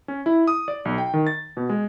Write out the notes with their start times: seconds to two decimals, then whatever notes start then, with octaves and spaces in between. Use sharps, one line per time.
0.08 C#4
0.26 E4
0.47 D#6
0.68 D5
0.85 B1
0.98 G5
1.14 D#3
1.27 A6
1.57 B2
1.69 G#3